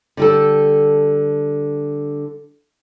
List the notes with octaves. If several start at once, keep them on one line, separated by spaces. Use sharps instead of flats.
D3 G3 A4